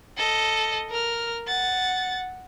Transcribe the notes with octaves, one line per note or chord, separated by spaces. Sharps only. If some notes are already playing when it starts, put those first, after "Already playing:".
A4 D#5
A#4 F6
F#5 A6